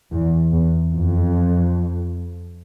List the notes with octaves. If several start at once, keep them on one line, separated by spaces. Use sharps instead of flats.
E2
E2
F2